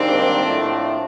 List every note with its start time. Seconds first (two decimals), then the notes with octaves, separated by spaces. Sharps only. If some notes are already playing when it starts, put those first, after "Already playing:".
Already playing: G#1 G#2 D#3 G3 A#3 C4 D4
0.42 A2 F3 A3